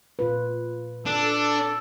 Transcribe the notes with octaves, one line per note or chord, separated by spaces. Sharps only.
A#2 F4 B4
D4 A4